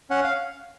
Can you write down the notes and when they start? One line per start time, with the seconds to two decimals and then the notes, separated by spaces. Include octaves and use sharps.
0.10 C#4 F#5
0.24 F5